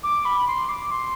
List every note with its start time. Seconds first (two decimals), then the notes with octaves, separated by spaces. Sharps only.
0.03 D6
0.25 B5
0.47 C6
0.69 D6
0.91 C6